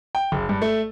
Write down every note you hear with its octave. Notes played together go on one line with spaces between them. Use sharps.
G5
F#1
G2
A3